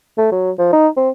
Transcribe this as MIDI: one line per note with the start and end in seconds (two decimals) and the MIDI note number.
0.18 0.27 57
0.32 0.51 54
0.58 0.69 53
0.73 0.88 63
0.97 1.09 60